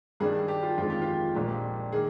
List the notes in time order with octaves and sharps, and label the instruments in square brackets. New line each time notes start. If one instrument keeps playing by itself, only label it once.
[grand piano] G2 D#3 G3 D4 G#4
G4
F4
G1 F2 D#3 G#3 C4 F4
G4
F4
A#1 A#2 G#3 D4 G4
D#3 A#3 G#4